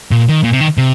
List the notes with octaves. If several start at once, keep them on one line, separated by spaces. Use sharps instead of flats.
A#2
D#3
A#2
C3
D#3
C3